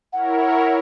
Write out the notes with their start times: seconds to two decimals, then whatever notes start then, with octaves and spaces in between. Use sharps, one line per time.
0.13 E4 A#4 C#5 F#5